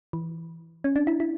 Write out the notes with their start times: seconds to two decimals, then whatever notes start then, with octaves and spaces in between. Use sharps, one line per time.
0.13 E3
0.84 C#4
0.96 D4
1.07 E4
1.20 E4